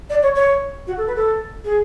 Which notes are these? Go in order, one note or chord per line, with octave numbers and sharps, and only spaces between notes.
D5
C#5
C#5
F#4
A4
B4
A4
G#4